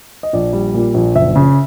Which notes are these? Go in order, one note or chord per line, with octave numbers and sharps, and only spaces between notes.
D#5
A#1 D5
G3
A#2
A#1
F#1 E5
C#3